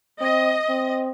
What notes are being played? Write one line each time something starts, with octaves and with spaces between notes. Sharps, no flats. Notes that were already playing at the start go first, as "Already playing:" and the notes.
C4 D#5
C4